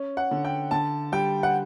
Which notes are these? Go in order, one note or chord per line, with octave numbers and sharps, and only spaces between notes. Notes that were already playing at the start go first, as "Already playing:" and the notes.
Already playing: C#4
F#5
D3
G5
D3 A5
G3 G5
F#5